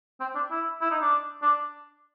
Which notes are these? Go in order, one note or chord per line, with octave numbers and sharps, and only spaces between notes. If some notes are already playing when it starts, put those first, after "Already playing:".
C4
D4
E4
E4
D#4
D4
D4